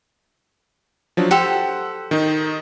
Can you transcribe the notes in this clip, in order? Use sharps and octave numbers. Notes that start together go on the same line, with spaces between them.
F3 F#3 D4
G4 A4 C5 F#5 E6
D#3 D#4